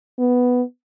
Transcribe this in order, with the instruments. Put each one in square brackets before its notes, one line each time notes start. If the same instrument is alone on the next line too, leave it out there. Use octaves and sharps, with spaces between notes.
[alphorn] B3